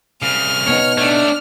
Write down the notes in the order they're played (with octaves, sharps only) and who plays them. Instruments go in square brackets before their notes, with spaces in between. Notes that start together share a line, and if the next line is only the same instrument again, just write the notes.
[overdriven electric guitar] C2 C#3 [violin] F6
[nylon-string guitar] B2 B3 D#4 [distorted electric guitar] C#5
[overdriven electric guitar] A3 [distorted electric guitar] D4 C#5